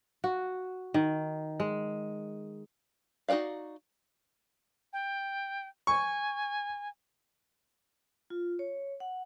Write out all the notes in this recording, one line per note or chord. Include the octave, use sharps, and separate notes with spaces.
F#4
D#3
G#3
D#4 F#4 B4 D5 F5
G5
G#5 C#6
F4
C#5
F#5